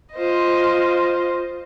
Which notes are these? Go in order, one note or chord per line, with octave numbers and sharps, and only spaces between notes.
F4 C5 D#5